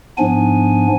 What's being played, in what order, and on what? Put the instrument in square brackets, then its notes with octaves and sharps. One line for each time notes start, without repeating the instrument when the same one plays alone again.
[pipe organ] G#2 F3 B3 D4 G#5